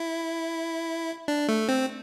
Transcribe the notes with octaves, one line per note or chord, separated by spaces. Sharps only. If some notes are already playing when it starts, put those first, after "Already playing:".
Already playing: E4
D4
A3
C4